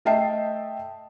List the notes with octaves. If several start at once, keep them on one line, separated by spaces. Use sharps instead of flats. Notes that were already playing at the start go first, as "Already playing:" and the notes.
A3 D#5 E5 G5 A5 C7